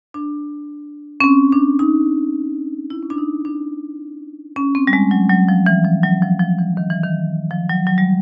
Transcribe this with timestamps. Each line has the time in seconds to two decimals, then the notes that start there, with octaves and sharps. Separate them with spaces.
0.14 D4
1.20 C#4
1.24 C4
1.52 D4
1.79 D#4
2.90 E4
3.03 C#4
3.10 D4
3.18 D#4
3.45 D4
4.56 C#4
4.75 C4
4.87 G3
4.93 G#3
5.11 F#3
5.30 F#3
5.49 F3
5.66 E3
5.85 F3
6.03 F#3
6.22 F3
6.40 F3
6.59 E3
6.77 D#3
6.90 E3
7.04 D#3
7.51 F3
7.69 F#3
7.87 F#3
7.98 G3